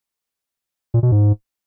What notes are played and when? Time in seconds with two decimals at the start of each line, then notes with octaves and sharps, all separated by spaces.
0.94 A#2
1.03 B2
1.12 G#2